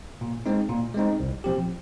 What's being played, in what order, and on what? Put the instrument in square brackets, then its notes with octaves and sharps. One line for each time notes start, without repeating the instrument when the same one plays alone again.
[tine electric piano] A#2
G#3 C4 D#4
A#2
G#3 C4 D#4
C2
A#2 F3 C4 G4